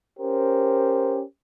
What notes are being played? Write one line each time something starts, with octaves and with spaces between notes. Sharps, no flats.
C#4 G4 A#4 C5